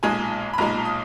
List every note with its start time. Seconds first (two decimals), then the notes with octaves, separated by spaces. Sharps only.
0.03 B1 A#2 G#3 D#4 G#5
0.53 B5
0.58 B1 A#2 G#3 D#4 A#5
0.85 D#6